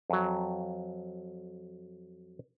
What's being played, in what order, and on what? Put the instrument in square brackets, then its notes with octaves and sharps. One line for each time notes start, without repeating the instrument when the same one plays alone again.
[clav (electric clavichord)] F2 F#3